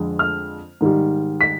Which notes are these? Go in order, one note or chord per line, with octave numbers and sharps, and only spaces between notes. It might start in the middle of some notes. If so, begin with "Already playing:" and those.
Already playing: F2 D3 G#3
F6
G#2 D#3 G3
B6